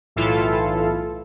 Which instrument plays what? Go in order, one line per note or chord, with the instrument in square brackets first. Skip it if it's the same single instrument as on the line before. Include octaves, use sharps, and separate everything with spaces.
[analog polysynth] B1 A2 E3 E4 F4 A4